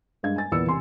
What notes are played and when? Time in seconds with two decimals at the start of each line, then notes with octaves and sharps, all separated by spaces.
0.23 G2 G#3 D4 F5 G#6
0.36 G#5 A6
0.52 E2 A#2 B3 E4 E6 C#7
0.66 E1 C3 G#5 C6